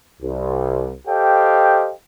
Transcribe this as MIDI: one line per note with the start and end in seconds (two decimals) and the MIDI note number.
0.22 0.93 36
1.08 1.92 67
1.08 1.92 69
1.08 1.92 72
1.08 1.92 75
1.08 1.92 77
1.08 1.92 79